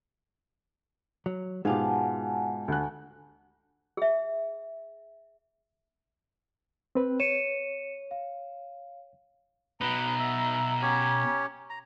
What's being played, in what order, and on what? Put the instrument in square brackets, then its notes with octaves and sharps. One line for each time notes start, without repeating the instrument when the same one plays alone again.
[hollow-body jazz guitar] F#3
[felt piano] G#2 B2 [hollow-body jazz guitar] G#3 F4 G4 [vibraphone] F#5 G#5 A5
[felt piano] D2 F#6
[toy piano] G#4 E5
[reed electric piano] C4 B4
[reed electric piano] C#5 [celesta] C#7 D#7 E7
[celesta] F5
[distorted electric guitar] B2 D#4 [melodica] B4 [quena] A#5
[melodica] E5
C#4 G4 C#5
A#5